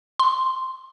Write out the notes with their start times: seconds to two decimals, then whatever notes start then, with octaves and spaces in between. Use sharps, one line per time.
0.19 C6